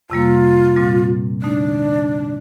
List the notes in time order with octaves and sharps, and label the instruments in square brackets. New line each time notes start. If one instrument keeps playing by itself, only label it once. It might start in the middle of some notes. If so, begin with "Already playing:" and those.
[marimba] F2 C3 G3 A#3 [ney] F4
[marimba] A#2 G3 C4
[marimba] D3 A3 D#4 [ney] D4